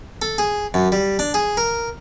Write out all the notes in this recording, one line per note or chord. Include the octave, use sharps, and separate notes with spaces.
A4
G#4
F#2
G3
D4
G#4
A#4